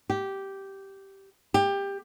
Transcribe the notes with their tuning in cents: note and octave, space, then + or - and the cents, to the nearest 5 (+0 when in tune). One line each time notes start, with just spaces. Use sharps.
G4 -10
G4 +20